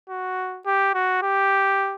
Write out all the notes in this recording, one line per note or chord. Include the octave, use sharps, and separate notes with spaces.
F#4
G4
F#4
G4